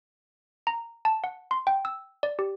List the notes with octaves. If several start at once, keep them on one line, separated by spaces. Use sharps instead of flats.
A#5
A5
F#5
C6
G5
E6
D5
G4